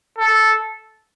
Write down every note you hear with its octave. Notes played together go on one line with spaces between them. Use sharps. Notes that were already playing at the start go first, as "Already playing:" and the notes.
A4